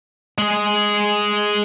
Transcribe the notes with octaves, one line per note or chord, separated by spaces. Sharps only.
G#3 G#4